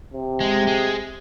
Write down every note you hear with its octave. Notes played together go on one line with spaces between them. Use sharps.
C3
G#3
G#3